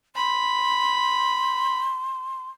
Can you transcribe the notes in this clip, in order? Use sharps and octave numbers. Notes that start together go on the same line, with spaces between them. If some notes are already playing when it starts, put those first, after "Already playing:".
B5 C6